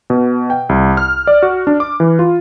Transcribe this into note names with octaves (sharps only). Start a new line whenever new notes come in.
B2
G5
C2
F6
D5
F#4
D4
D6
E3
F4